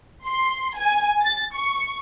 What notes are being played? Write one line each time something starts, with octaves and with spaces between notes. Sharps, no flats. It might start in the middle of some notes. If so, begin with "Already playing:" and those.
C6
G#5
A6
C#6